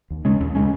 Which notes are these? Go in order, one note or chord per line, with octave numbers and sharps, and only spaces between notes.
D#2
C#3 G#3 C#4
D#2
C#3 G#3 C#4